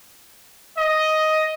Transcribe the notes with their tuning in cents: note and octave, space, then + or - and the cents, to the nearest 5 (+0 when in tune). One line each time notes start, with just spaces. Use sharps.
D#5 +5